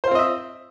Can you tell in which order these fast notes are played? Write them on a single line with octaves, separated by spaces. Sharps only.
C5 F4 C4 D#5 E5